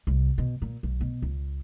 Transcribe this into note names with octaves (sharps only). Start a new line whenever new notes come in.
C2
B2
A#2
B1
B2
C#2